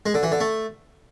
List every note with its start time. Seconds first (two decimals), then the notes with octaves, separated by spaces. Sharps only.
0.06 G#3
0.14 D3
0.23 E3
0.32 D3
0.40 A3